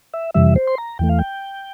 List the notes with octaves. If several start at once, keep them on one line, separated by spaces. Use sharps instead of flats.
E5
F2 C3 E3 G3 E5
C5
C6
A#5
E2 E3 A3 G5
F5
G5